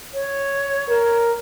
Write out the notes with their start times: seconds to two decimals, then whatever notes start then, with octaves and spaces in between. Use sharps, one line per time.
0.13 C#5
0.89 A#4